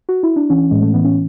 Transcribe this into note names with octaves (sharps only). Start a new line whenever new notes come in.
F#4
E4
D4
E3 C#4
A2 G#3
A3
E3 B3
C#4